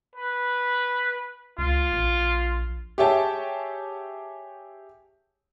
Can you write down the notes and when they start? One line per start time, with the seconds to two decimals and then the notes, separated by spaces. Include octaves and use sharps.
0.15 B4
1.58 C#2 F4
1.93 A#1
2.98 G4 G#4 C#5 E5 G5 A5